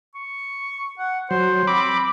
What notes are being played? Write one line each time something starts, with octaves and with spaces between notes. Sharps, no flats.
C#6
F#5
F#3 C5
C4 B5 D6